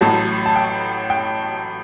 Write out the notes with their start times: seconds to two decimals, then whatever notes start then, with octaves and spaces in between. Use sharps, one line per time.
0.01 A1 A2 F#3 A5
0.46 A5
0.56 G5
1.10 G5